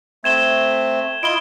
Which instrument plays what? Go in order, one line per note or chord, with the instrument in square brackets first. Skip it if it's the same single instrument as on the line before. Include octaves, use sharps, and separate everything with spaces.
[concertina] A3 C4 [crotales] G#6 E7 G7
[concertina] E4 F4 D#5 [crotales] D7 G7